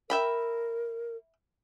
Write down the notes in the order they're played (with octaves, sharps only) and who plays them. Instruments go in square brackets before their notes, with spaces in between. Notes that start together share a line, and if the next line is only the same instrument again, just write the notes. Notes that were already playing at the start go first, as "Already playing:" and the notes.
[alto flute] A#4 [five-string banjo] E5 G5 B5